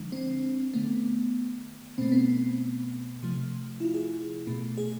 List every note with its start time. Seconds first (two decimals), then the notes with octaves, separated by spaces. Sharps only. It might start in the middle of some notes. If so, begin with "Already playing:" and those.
Already playing: D3 F3 G#3 D4
0.12 C4
0.74 D3 A3 B3
1.98 B2 A3 C4
2.12 B3
2.25 C4
3.23 C3 F3 A3
3.80 E4
3.85 F4
3.94 G#4
4.47 B2 A3
4.78 G#4